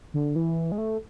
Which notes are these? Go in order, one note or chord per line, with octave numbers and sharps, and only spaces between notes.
D3
E3
G#3
A3